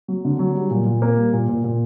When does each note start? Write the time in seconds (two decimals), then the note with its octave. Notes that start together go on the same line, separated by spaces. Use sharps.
0.08 F#3
0.25 D3
0.39 F#3
0.55 G3
0.70 A#2
0.86 A#2
1.02 A#3
1.17 G3
1.33 A#2
1.48 A#2
1.64 A#2